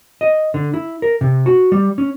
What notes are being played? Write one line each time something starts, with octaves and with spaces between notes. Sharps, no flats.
D#5
D3
E4
A#4
C3
F#4
G3
C#4